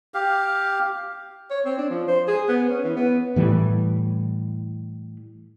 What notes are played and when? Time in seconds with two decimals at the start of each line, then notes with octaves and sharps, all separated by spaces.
0.14 G4 F5
1.50 C#5
1.65 C4
1.78 D4
1.90 F3
2.08 C5
2.28 G#4
2.48 B3
2.69 C#4
2.84 E3
2.96 B3
3.36 A2 E3 G3